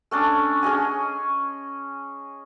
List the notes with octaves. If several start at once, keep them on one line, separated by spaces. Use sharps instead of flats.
A3 C#4 D4
C#4 G#4 D#5 G#5